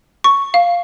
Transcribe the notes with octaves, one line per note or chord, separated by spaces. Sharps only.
C#6
F5